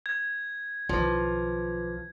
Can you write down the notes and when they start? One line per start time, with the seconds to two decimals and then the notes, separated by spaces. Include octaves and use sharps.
0.06 G#6
0.89 B1 D#3 F3 F4 B4 D6